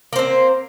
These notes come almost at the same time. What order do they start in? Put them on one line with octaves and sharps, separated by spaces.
A#3 C5 C4